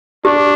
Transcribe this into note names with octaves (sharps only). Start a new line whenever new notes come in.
D4 G4